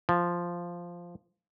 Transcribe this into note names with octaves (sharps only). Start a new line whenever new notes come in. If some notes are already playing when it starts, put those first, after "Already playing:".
F3